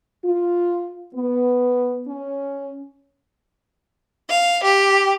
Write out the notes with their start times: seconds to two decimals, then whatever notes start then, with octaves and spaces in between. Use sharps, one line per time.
0.25 F4
1.14 B3
2.08 C#4
4.29 F5
4.62 G4